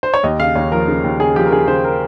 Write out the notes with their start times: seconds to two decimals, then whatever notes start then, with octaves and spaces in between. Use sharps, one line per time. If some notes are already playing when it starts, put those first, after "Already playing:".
0.03 C5
0.14 C#5
0.24 D#2 D#5
0.40 C#3 F5
0.56 D#2 C#5
0.72 F3 A#4
0.88 C#3
1.04 D#2
1.20 C#3 G#4
1.36 F3 G4
1.46 A#4
1.52 C#3 G#4
1.68 C#3 C5
1.84 A#4